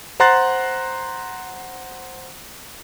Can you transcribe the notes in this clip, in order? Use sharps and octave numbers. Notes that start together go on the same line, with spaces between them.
C5 F#5 A#5 C6 F#6 A6